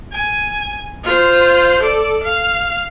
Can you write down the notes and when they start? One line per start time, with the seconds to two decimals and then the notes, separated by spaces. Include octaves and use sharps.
0.13 G#5
1.04 F4 C5
1.81 A4 D5
2.23 F5